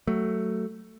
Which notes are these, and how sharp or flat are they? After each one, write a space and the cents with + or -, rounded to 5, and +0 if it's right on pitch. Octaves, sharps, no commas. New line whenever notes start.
F#3 +20 A3 +10